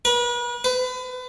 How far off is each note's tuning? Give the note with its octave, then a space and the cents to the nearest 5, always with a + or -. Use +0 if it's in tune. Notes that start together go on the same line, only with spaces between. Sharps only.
B4 -40
B4 +35